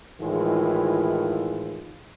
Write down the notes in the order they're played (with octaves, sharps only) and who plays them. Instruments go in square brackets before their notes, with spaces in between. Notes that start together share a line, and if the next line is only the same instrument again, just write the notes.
[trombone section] A2 D#3 E3 G#3 F4